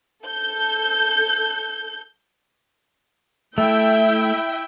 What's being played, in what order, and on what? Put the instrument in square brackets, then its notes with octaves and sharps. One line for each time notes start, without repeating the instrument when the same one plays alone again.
[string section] A4 G6
[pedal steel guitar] A3 [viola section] E4 E5 G5